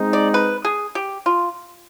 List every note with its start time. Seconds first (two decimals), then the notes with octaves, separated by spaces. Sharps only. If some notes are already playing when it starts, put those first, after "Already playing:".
Already playing: G#3 C4 D#4
0.13 D5
0.34 B4
0.65 G#4
0.95 G4
1.26 F4